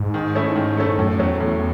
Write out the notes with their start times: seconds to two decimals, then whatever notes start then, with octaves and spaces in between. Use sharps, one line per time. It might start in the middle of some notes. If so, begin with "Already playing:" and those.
Already playing: G#2
0.14 D#3
0.35 A3 C#4 E4 A4
0.56 D#3
0.77 A3 C#4 E4 A4
0.98 F#2 A2
1.19 E2 F#3 A3 C#4
1.40 A2